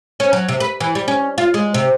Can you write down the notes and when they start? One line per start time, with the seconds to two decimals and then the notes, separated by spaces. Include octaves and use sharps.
0.20 C#4
0.33 F#3
0.49 C3
0.60 B4
0.81 E3
0.95 G3
1.08 C#4
1.38 F4
1.54 G#3
1.74 C3